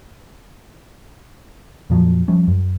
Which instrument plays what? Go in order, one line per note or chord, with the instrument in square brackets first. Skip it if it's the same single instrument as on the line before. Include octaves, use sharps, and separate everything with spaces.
[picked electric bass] F2 A#2 F3 F#3
F3 G3 C#4
F#2